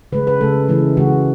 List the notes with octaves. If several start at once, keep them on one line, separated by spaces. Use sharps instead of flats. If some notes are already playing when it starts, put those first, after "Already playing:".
C#3 G#3 B4
B4
C#3 G#3 A4
C#3 E3 G#3
C#3 E3 G#3 F#4